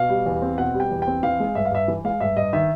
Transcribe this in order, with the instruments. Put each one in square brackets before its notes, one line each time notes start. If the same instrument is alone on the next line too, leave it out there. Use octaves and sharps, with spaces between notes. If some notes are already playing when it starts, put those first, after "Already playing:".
Already playing: [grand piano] B2 F5
G3
E2
C4
B2 F#5
G3
G5
E2
G5
C4
E3 F5
G#3
G2 E5
F5
G2 E5
E3
G#3 F5
G2 E5
G2 D#5
D#3 E5